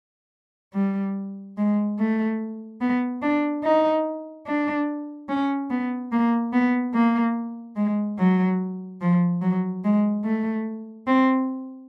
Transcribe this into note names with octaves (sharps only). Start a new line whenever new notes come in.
G3
G#3
A3
B3
D4
D#4
D4
C#4
B3
A#3
B3
A#3
G#3
F#3
F3
F#3
G#3
A3
C4